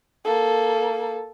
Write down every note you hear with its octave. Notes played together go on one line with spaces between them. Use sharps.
A#3 A4